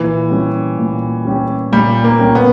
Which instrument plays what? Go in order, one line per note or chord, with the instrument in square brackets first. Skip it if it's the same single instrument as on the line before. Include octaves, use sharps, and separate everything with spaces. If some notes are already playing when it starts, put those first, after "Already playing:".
Already playing: [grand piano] A#2 [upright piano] E3
[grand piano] G3 C#4 G4
A#2
G3 C#4 G4
[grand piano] A#2 [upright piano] G3
[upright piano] A#3
[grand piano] G3 C#4 G4
[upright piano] B3